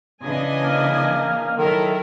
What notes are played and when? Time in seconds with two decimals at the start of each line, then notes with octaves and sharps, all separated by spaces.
0.21 C#3 E3 D4 D#5 G#5
0.61 A#3
1.57 D#3 F#3 E4 A4 A#4